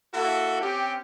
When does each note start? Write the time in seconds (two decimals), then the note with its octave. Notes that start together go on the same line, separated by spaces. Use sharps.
0.14 A#3 E4 F#4 A4
0.61 C4 C#4 G4